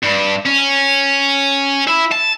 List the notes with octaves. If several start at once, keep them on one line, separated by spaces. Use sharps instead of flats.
G2
C#4
E4
A5